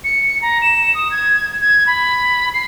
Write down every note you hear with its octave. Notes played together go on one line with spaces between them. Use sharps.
C#7
A#5
E7
D#6
G#6
G#6
B5
C7